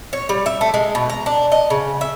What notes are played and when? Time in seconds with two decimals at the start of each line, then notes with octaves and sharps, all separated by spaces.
0.13 C#5
0.29 G3
0.46 E5
0.61 A3
0.74 G#3
0.95 B2
1.10 A#5
1.26 D4
1.52 D#5
1.70 C#3
2.01 E5